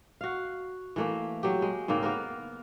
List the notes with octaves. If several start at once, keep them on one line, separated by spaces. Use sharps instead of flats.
F#4 F5
E3 A3 A#3
F#3 G4
G#3
G#2 C#3 A#3 C4
A#3 B3 A#4